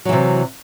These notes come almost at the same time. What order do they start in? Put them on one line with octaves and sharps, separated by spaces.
F#3 E3 C3